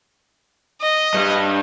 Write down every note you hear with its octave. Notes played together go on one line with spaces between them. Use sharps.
D#5
G2 G3